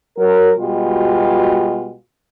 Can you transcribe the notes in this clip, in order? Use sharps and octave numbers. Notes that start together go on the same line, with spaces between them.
F#3 A#4
B2 G3 G#3 F4 F#4